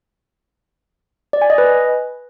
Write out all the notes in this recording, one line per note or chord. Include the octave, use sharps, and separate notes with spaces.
D5
G#5
D#5
B4